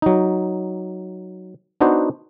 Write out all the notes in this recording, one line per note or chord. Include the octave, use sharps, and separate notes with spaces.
F#3 D#4
B3 D4 D#4 F#4 C5